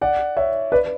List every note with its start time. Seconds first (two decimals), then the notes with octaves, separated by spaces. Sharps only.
0.01 D5 F#5
0.37 C#5 E5
0.72 B4 D5